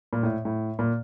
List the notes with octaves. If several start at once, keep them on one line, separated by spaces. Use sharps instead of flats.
A#2
A2
A2
A#2